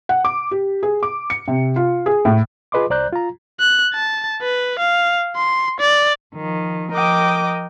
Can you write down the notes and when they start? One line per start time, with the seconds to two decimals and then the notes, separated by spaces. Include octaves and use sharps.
0.09 F#5
0.25 D6
0.51 G4
0.83 G#4
1.03 D6
1.30 C#7
1.48 C3
1.76 F4
2.06 G#4
2.25 A2
2.72 F4 G#4 B4 D#5 C6 D6
2.90 C2 C5 D5 A#5 F#6 G6
3.13 F4 A#5
3.60 F#6
3.94 A5
4.42 B4
4.79 F5
5.36 C6
5.80 D5
6.35 D#3 F3
6.91 F3 A#4 D#5 G5 D6 D#6